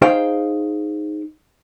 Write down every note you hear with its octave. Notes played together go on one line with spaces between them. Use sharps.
D#4 G#4 C5 F5 G5